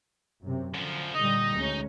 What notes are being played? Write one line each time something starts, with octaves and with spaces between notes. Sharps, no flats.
F#2 C3
F#2 D3 F3
A#2 D3 G3 D#4 D#5
D2 G#3 C#4